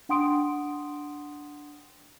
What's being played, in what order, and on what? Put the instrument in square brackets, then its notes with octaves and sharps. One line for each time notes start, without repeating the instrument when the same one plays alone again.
[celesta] D4 F#5 G5 C6 D#6 D7